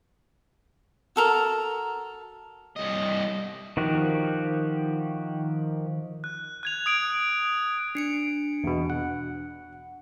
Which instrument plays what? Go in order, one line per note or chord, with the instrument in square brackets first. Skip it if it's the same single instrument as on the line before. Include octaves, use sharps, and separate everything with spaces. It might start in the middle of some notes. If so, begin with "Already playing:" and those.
[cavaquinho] F#4 A4 A#4
[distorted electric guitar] C2 D#5
[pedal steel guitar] D#3 F3 F#4 G4
[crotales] F#6
F#6 G#6 F7
D#6 G#6 D7
[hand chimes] D4 C#7 D7
[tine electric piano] E2 B2
F#5